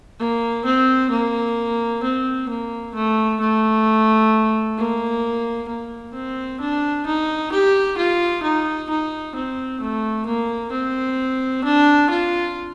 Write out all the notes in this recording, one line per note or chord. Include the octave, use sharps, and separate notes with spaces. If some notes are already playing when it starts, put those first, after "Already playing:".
A#3
C4
A#3
C4
A#3
A3
A3
A#3
A#3
C4
D4
D#4
G4
F4
D#4
D#4
C4
A3
A#3
C4
D4
F4